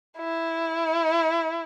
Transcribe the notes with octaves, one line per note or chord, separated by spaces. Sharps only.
E4